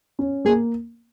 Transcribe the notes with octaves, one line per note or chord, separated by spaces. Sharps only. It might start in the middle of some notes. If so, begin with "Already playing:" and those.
C#4
A#3 G#4